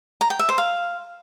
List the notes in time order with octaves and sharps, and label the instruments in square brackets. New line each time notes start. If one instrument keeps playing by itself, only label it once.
[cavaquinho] A#5
G5
E5
C5
F5